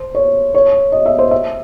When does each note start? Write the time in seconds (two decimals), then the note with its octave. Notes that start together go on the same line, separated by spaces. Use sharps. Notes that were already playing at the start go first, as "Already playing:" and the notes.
Already playing: C5
0.15 C#5
0.54 C#5
0.92 D#5
1.06 E5
1.19 C5
1.31 E5